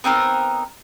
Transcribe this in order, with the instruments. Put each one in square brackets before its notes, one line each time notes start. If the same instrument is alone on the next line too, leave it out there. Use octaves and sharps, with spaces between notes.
[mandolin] B3 C4 D#4 A#4